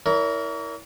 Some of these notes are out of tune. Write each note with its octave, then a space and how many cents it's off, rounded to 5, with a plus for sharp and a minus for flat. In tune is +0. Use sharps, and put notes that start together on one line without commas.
E4 -20 A#4 +0 C#5 +45